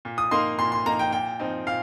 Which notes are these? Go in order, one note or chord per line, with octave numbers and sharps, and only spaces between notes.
A#2
D#6
A#3 D#4 C6
A#2 C6
C6
A#3 D#4 A#5
G5
A#2 G5
F3 C4 D#4
A#2 F5